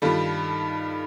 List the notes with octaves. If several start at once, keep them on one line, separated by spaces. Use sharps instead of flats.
G2 D#3 G3 F4 A4